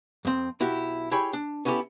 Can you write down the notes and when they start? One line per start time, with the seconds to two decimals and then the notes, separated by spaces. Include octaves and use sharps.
0.25 F2 C4
0.60 B1 E4 F#4 G4
1.11 E4 G4 G#4 C#5 G5 B5
1.33 D4
1.65 B3 C#4 E4 F#4 G4 A4